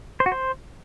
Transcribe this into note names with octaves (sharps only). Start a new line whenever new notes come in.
C5
F#4
C5